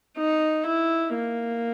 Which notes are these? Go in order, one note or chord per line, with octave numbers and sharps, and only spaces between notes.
D#4
E4
A#3